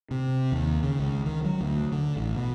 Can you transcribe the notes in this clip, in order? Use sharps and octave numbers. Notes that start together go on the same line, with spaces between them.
C3
D#2
C#3
C#2
D#3
F#3
D2
D3
A1
B2